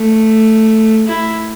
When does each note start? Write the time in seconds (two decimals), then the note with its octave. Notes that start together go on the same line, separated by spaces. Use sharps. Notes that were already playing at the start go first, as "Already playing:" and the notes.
Already playing: A3
1.07 E4